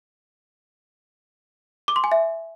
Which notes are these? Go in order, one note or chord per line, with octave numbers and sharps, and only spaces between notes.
D6
C6
G#5
E5